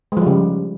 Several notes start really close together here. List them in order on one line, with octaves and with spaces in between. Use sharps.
G#3 F3 G3 C#3